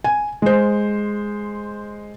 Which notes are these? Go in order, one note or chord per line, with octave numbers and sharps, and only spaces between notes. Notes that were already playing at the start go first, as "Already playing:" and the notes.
G#5
G#3 C5